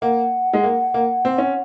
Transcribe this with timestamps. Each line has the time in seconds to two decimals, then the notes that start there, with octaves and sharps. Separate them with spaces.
0.02 A#3 F#5
0.53 G#3
0.64 A#3
0.94 A#3
1.25 C4
1.38 C#4